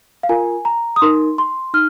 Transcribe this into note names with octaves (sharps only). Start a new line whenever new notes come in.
F5
F4 A#4 G#5
A#5
D#6
D#4 A#4 C6
C6
D#4 F6